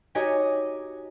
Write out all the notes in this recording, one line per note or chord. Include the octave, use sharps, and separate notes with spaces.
D#4 F#4 G4 C#5 D#5 G#5